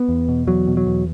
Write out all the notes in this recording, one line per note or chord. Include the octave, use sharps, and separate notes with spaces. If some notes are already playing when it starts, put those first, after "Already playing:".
Already playing: B3
E2
B2
E2 F#3
B2
F#3
E2